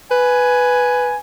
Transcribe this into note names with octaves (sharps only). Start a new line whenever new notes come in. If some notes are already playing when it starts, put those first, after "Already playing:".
B4 G#5